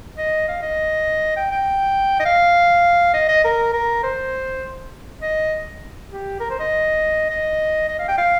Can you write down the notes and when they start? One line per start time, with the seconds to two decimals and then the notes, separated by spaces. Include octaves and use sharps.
0.17 D#5
0.48 F5
0.62 D#5
1.37 G5
1.51 G5
2.20 D#5
2.25 F5
3.14 D#5
3.29 D#5
3.44 A#4
3.73 A#4
4.03 C5
5.22 D#5
6.11 G4
6.40 A#4
6.50 C5
6.60 D#5
7.30 D#5
7.88 D#5
7.99 F5
8.08 G5
8.18 F5